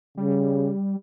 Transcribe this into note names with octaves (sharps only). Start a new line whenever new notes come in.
C#3 G3